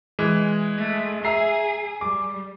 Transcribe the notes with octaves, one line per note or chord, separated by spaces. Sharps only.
E3 G#3
A3
G#4 E5 A#5 C7
G3 D6